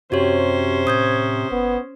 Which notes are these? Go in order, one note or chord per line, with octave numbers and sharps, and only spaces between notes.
F#2 C3 C#4 F#4 G4 C5 C#5
A2 D#6 G6 G#6
G1 B3